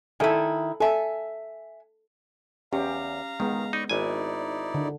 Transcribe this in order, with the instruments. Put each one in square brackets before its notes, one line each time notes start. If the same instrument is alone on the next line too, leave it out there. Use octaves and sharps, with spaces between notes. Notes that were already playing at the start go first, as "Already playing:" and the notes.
[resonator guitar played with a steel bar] D#3 E4 [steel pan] A4 E5 G#5
[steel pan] A4 [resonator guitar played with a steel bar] E5 G#5
[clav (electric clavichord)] E2 [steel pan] C#4 G4 [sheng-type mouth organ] F5 A#5
[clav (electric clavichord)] D#3 [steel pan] G#3 B3
[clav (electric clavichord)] D#4 [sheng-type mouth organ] D5 B5 C#6
[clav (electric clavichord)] G#1 G#5 [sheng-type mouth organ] D#4 E4 D5
[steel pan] D3